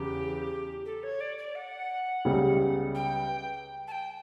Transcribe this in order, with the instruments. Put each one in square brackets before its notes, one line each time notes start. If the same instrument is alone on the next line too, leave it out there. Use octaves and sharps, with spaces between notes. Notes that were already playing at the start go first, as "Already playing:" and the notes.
Already playing: [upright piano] E2 C#3 [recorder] G4
[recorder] A4
C#5
D5
D5
F#5
[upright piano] C#2 C#3 G3 B3
[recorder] G5
A5
G5